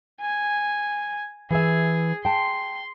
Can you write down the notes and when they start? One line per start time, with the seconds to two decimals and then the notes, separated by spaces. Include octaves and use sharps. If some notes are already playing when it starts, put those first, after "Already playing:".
0.21 G#5
1.51 E3 G#4 E5
2.25 G5 A5 C6